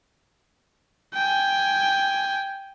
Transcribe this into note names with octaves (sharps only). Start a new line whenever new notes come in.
G5 G#5